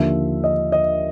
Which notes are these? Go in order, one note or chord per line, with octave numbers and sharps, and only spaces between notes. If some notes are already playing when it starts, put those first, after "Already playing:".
Already playing: D#2 D3 F3 E5
D#5
D#5